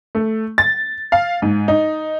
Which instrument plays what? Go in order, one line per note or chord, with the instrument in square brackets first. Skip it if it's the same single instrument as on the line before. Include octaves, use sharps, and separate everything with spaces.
[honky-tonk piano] A3
A6
F5
G#2
D#4